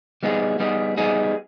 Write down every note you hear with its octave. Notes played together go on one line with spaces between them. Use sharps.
G3 B3 D#4 G#4
G3 B3 D#4 G#4
G3 B3 D#4 G#4